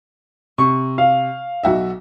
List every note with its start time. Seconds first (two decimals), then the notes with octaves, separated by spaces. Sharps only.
0.58 C3 C#6
0.98 F5
1.63 B1 F#4 E5